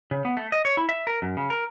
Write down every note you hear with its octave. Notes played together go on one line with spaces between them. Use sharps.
C#3
B3
A3
D#5
C#5
E4
E5
A#4
F#2
C#3
A#4